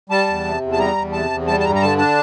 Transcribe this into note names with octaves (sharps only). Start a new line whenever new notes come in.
G3 A5
E2
C3
E2
A5
G3 A#5
E2
C3 A5
E2
G3 A5
A5
G2 A#5
A#5
D3 A5
D4 A5